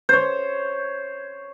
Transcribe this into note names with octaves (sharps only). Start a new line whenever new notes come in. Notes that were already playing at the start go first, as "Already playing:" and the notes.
C5 C#5